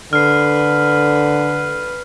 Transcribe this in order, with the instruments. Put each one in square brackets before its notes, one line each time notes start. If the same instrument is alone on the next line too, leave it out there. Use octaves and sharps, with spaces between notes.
[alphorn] D3 [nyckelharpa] B4 [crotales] F6 C7